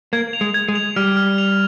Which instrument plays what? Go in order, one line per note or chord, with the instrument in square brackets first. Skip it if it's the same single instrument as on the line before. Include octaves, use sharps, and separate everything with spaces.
[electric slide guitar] A#3 [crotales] G#6
[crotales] F7
[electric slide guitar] G#3
[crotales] G#6
[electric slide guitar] G#3
[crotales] F7
[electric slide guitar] G3 [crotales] F6
[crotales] F6
F7